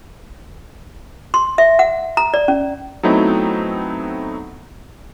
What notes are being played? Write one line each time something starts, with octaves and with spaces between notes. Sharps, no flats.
C6
E5
F#5
A#5
D5
C#4
F#3 A3 B3 C4 D#4 E4